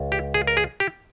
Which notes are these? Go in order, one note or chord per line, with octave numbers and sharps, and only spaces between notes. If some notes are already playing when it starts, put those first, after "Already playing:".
Already playing: C#2
G4
G#4
A#4
G#4
G4